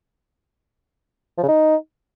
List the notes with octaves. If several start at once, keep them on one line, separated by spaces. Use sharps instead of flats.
F3
C#3
D#4